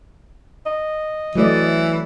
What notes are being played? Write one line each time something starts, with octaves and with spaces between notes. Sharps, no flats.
D#5
E3 F#3 A3 D5